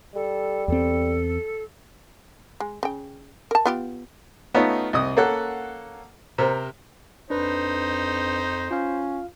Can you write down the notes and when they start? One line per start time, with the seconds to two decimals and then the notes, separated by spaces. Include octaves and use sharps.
0.15 G3 A4
0.68 E2 C4 A4
2.60 G#3
2.83 C#3 G5
3.51 A#4 A5
3.65 B3 F4 G4
4.54 A3 B3 C#4 D#4 F4
4.93 C2 D#5 D#6
5.17 A#3 C#4 A4 F#5 F#6
6.38 C3 A#4 C5
7.30 F2 D4 D#4 B4 C5
8.71 C#4 F4 F5